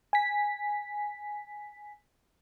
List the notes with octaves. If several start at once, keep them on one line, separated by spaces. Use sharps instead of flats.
G#5 B6